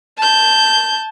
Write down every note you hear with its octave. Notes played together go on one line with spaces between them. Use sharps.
A5 G6